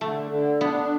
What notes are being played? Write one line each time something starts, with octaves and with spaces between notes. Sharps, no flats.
D3 A3
D3
B3 D4